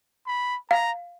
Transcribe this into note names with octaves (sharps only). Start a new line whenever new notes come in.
B5
F5 A#5